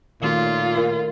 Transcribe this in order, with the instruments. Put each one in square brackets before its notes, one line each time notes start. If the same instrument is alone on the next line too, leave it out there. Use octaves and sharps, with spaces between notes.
[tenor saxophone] A#2 [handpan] D#3 A3 C#4 [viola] F4
[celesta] A#4